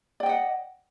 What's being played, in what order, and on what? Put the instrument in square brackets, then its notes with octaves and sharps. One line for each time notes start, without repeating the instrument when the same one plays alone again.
[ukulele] D5
G5
D#5
F#5